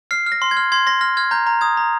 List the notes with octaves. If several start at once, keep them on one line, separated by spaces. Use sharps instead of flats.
F6 C7
F6
A#6
C6
G#6
F6
C6 G#6
C6 A#6
F6 A#6
F6 G#6
A#5 G6
A#5
D#6 G#6
A#5